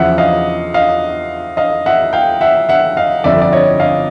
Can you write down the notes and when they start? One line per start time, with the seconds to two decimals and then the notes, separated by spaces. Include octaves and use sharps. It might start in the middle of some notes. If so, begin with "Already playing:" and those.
Already playing: E2 C#3 F3 E5 F#5
0.18 D#5 F5
0.74 D#5 F5
1.57 D#5 F5
1.86 E5 F#5
2.13 F5 G5
2.41 E5 F#5
2.69 E5 F#5
2.97 D#5 F5
3.24 G1 F2 D3 D5 E5
3.42 D5
3.53 C#5 D#5
3.80 D#5 F5